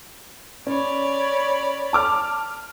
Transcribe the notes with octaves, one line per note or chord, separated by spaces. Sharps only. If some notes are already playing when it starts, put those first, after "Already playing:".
C#4 C#5 D5 B5
A5 D6 F6